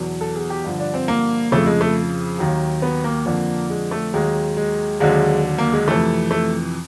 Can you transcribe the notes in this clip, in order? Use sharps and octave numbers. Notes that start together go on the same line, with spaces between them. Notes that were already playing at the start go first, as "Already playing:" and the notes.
Already playing: E2 B2 F#3
A4
G#4
G4
G2 D3 F3
D4
C4
A#3
F2 C#3 F3 A3
G#3
A3
D#2 D#3 F#3
B3
A#3
F2 D3 F3
G#3
A3
D#2 D#3 F#3 G#3
G#3
D#2 D3 F#3 G#3
A#3
G#3
F2 C3 E3 A3
A3